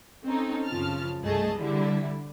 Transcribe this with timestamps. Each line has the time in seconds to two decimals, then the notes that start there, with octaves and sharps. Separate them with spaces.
0.27 C4 C#4 D#4 A4
0.66 F#2 C#3 F3 F4 A5 F6
1.22 C2 G2 A3 G#4 D#5 A5
1.55 D3 G3 E4